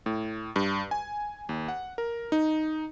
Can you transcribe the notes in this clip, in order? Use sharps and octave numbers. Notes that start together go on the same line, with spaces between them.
A2
G2
G#5
D#2
F#5
A#4
D#4